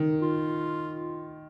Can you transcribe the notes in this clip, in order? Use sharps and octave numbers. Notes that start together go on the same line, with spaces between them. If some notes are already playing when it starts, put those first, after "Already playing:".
Already playing: D#3
F4